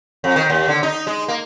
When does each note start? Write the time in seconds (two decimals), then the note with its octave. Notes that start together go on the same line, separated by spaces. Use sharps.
0.24 F2
0.36 D#3
0.50 D#2
0.68 D3
0.83 D#4
1.07 G#3
1.28 A#3